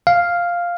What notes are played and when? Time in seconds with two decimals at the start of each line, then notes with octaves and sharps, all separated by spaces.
0.07 F5